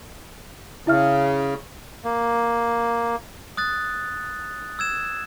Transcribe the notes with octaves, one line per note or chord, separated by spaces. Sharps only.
C#3 E4 E5 F6
A#3
D#6 F#6 A6
E6 G#6 E7